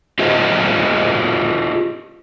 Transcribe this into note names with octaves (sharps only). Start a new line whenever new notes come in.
F4 G4 G#4 C5 D#5 E5